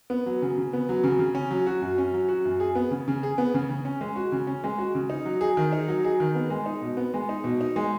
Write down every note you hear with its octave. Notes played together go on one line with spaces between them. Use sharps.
B3
F#3
C#3
C#3
B3
F#3
C#3
C#3
C#4
F#3
F#4
F#2
C#4
F#3
F#4
F#2
G#4
B3
C#3
C#3
G#4
B3
C#3
C#3
C#4
G#3
F#4
C#3
C#4
G#3
F#4
C#3
D#4
F#3
G#4
D#3
D#4
F#3
G#4
D#3
B3
G#3
D#4
B2
B3
G#3
D#4
B2
D#4
G#3